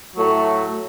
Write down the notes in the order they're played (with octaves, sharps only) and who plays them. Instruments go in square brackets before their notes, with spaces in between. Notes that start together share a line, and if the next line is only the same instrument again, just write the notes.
[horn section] A2 F#3 A3